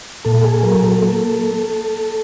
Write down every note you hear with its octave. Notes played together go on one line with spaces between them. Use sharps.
A#2 A4
G#4
F#3 A#4
A4
A#3 A4